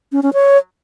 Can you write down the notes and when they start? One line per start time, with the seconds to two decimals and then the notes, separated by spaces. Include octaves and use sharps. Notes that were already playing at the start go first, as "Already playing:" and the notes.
0.12 C#4
0.23 C#4
0.33 C#5